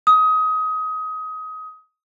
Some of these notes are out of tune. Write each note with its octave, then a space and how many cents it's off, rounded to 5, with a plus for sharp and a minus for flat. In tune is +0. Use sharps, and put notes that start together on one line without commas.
D#6 +25